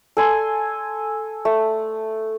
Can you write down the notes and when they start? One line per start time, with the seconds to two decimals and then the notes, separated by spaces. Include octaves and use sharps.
0.17 A4 G#5 C6
1.45 A3